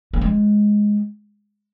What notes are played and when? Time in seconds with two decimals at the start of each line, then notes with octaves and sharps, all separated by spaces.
0.13 A#3
0.21 G#3